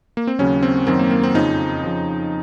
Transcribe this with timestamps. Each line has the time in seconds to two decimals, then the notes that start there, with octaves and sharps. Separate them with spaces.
0.17 A#3
0.27 C4
0.39 D#2 C#3 F#3 C#4
0.63 C4
0.87 F#2 D#3 F#3 C4
0.99 A#3
1.11 A#3
1.23 C4
1.35 F2 C#3 F3 D#4
1.84 F2 C#3 F3